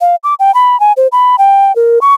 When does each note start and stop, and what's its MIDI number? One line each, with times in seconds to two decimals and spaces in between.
0.01 0.16 77
0.24 0.34 86
0.39 0.54 79
0.54 0.79 83
0.80 0.93 80
0.97 1.07 72
1.12 1.36 83
1.38 1.75 79
1.76 1.99 70
2.01 2.14 85